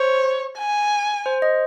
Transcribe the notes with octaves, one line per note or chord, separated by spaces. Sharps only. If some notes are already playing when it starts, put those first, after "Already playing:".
Already playing: C5 C#5
G#5
C5
D#5